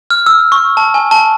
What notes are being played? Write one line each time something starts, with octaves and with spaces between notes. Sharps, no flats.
F6
E6
C#6
A5
G#5
A5